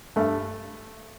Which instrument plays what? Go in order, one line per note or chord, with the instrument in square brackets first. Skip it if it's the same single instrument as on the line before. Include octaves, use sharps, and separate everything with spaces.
[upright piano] G2 [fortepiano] A3